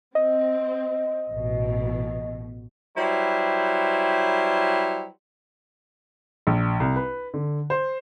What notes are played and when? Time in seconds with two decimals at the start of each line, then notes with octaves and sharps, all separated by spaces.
0.15 C4 D#5
1.29 A1 B2
2.96 F#3 G3 E4 B4 C5
6.47 A#1
6.80 C2
6.96 B4
7.34 D3
7.70 C5